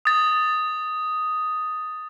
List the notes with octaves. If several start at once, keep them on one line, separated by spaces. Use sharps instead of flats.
D#6 A6